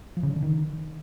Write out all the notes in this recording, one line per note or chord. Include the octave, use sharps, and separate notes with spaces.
F3
C#3
D4
D3
D#3